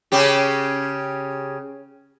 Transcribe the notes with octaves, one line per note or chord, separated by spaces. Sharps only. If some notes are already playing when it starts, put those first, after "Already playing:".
C#3 C#4 G4